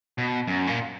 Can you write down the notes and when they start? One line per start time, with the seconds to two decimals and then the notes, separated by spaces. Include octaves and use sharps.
0.18 B2
0.48 F#2
0.67 A#2